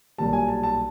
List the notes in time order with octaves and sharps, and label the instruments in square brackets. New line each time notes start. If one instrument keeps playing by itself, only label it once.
[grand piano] B1 A#2 G3 A5
G#5
A5
A5